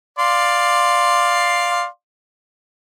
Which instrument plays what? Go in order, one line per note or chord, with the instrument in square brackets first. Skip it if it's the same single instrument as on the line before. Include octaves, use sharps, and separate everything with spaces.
[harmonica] D5 F5 C6